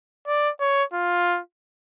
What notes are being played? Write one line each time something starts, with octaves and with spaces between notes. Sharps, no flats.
D5
C#5
F4